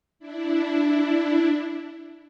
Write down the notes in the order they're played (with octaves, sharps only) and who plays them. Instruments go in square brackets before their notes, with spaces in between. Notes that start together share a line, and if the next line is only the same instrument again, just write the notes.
[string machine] D4 E4